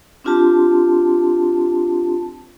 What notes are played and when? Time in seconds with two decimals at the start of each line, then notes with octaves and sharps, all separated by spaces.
0.24 C4 D4 F4 G4 A5 C6